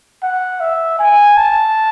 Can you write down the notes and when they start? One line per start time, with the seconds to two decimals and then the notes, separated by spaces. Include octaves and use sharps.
0.23 F#5
0.60 E5
0.99 G#5
1.37 A5